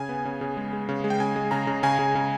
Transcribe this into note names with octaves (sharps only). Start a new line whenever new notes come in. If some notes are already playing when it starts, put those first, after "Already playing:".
Already playing: C#3 G#5
B3
C#3
C#3
G#3
G#3
C#3
G#3
G5
C#3 G#5
G#3
C#3 A#5
C#3
C#3 G#5
C#3
C#3